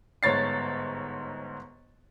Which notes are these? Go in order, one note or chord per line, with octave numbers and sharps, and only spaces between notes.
G1 G#2 C#5 A6 C7